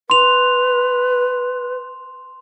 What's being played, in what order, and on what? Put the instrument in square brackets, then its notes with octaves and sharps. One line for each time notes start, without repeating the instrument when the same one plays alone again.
[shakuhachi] B4 [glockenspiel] C6 F7